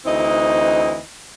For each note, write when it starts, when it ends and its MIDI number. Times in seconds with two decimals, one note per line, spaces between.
0.06 1.00 38
0.06 1.00 52
0.06 1.00 60
0.06 1.00 63
0.06 1.00 64
0.06 1.00 75